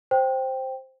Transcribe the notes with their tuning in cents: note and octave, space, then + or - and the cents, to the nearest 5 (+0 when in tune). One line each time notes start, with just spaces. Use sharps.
C5 +5 G5 +0